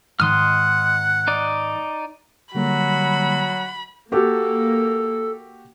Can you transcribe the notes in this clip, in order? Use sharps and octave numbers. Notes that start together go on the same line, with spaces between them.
G#2 D#3 F#5 C6 D#6 F6
D#4 D5
D3 F#3 G3 A#3 F#4 B5
A#3 F#4 G4 A4